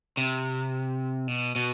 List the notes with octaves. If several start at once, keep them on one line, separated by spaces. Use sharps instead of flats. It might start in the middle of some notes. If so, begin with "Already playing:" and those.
C3
B2
B2